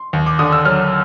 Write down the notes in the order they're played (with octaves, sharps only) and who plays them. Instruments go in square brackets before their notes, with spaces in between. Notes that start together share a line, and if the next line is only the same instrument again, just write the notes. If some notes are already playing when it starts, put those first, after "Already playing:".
Already playing: [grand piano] C6
D#2
D6
D3 D#6
E6
F#3 F6